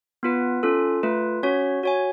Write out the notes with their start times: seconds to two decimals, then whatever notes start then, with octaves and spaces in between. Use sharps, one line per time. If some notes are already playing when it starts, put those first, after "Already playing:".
0.23 B3 F4 B4
0.63 C#4 F4 A4
1.03 A3 F4 B4
1.43 C#4 F#4 C#5
1.83 F#4 C#5 G#5